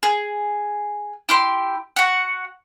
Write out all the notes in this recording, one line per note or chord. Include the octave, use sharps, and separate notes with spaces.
G#4
E4 G4 C6
F#4 F#5